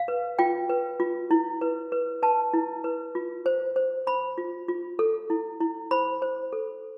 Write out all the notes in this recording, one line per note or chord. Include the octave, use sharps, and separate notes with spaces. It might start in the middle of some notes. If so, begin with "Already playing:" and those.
Already playing: F5
B4
F4 G5
B4
F4
E4
B4
B4
B4 A5
E4
B4
F4
C5
C5
C5 B5
F4
F4
A4
E4
E4
C5 B5
C5
A4